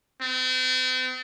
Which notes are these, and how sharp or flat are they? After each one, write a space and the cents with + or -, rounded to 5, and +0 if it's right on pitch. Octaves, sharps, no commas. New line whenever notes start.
C4 -40